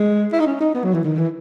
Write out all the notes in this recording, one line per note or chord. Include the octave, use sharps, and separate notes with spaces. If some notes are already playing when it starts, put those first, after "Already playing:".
Already playing: G#3
E4
D#4
C#4
D#4
B3
F#3
E3
D#3
E3